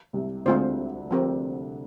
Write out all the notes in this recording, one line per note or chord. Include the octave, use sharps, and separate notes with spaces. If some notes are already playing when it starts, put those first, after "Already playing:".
C2 C3
D2 D3 G#3 C4 F4 C5
F3 C4 G4 A#4